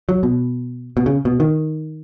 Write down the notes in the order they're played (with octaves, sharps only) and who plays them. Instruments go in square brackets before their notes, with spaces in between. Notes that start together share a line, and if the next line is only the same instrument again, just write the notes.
[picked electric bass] F#3
B2
B2
C#3
B2
D#3